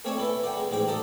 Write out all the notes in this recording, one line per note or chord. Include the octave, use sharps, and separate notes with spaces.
A3 C4 C#5 D5 G#5 A5
E4 A4 B4
D5 F#5 G5
G#3
A1 G#2 G#3 G5 D6
A4 D5 D#5 A5 A#5